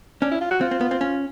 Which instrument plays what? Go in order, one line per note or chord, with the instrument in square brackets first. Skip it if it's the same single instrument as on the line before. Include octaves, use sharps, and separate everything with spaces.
[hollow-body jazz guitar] C#4 [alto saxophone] D4
[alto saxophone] E4
F4
F#4
[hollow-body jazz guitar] C4 [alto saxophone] F4
[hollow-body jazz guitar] C4
B3
C4
C#4